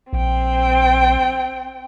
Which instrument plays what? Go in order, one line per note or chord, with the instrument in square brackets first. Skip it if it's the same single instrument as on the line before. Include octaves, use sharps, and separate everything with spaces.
[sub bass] A#1 [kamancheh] C4 G5